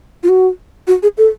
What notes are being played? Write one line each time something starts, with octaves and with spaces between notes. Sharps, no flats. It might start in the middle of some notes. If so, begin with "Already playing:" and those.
F4
F#4
F#4
G#4
A4